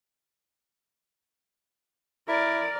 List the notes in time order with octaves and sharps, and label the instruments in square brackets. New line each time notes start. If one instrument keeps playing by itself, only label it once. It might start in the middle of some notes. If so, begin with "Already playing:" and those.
[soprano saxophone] E4 [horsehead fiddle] A#4 D5